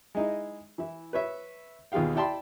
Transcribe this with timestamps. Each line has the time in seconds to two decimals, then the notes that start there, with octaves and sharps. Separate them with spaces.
0.15 G#3 D#4 E4
0.78 E3 E4
1.13 B4 C#5 E5
1.92 D#2 B2 F4 G#4 F5 G5
2.15 E4 D5 G5 A5 B5 C6